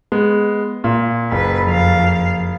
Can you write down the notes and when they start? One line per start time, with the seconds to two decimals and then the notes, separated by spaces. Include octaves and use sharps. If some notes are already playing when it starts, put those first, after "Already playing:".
0.12 G#3 B3
0.84 A#2
1.32 F#1 B4
1.66 F2 F5